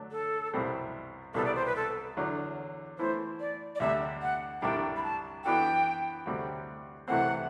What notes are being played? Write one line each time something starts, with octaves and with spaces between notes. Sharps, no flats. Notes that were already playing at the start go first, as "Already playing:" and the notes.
Already playing: D3 F#3 A3 D4
A4
C2 B2 G3 C4
C2 B2 G3 B3 A4
D5
C5
B4
A4
E2 D3 F#3
E3 A3 E4 C5
D5
D5
D2 C3 G3 D4 E5
F#5
C2 C3 G3 D4 G5
B5
A5
E3 B3 D4 F#4 A4 G5
D2 C3 G3 C4 F#4
C2 C3 E3 A3 C4 F#5